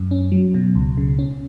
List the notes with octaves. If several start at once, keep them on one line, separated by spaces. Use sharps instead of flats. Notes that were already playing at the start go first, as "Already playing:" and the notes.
Already playing: F#2
C#4
F#3
B2
C#2
C#3
C#4